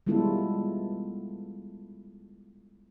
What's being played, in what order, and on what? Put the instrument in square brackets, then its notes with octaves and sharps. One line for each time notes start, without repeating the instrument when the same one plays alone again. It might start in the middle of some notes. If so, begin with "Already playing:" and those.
[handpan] G3 G#3 B3 E4 F4 A4